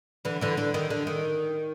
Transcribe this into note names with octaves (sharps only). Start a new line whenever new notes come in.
D3 E3
D3 E3
D3
D#3
D3
D#3